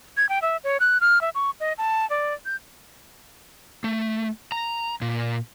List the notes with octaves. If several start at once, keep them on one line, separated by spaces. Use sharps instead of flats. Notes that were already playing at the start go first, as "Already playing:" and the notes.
G#6
G5
E5
C#5
F#6
F6
E5
C#6
D#5
A5
D5
G6
A3
A#5
A#2